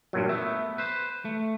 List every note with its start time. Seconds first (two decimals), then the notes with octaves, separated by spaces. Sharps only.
0.13 G2 A#2 F#3
0.29 A3 B3 E5
0.78 B4 C5
1.25 A3